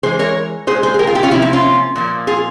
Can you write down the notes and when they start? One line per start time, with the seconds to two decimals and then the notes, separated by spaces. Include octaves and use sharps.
0.03 E3 G#3 G#4 C5
0.19 A#4 C#5
0.67 A#2 G#4 C5
0.71 G#3
0.83 G#4 C5
0.94 G#4
0.99 G4 A#4
1.07 F4 G#4
1.15 E4 G4
1.23 C#4 F4
1.31 C3 F3 A#3 C4 E4
1.42 C4 E4
1.53 C#4 F4
1.96 A#2 F3 A#3
2.27 F4 G#4